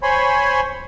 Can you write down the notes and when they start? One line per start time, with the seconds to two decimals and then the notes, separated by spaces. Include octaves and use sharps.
0.03 C5 C#5 G#5 B5 C6